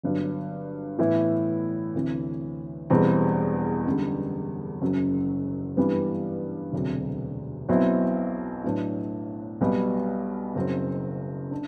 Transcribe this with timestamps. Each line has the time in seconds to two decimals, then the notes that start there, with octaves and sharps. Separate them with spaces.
0.03 G1 G2 F#3
0.99 A2 E3 B3 E4
1.95 D2 C3 E3
2.90 E1 E2 B2 G3 C4
3.85 F#2 D3 G3
4.82 F#1 F#2 F#3
5.77 G2 E3 G3 B3
6.72 E1 D2 C3 F#3
7.69 B1 B2 F#3 C4 E4
8.64 A2 F#3 B3 D4
9.61 B1 B2 G3
10.55 F#1 F#2 F#3 C4
11.51 D4